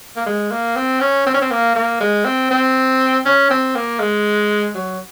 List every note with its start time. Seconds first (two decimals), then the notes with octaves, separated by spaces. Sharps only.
0.17 A#3
0.26 G#3
0.51 A#3
0.76 C4
1.01 C#4
1.27 C4
1.34 C#4
1.42 C4
1.51 A#3
1.76 A#3
2.01 G#3
2.25 C4
2.51 C4
3.26 C#4
3.51 C4
3.76 A#3
4.00 G#3
4.75 F#3